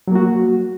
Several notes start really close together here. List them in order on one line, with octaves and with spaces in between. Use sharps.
F#3 A#3 F#4